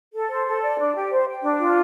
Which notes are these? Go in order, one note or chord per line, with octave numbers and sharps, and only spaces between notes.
A4
C5
A4
D5
D4
G4
C5
G5
D4
F4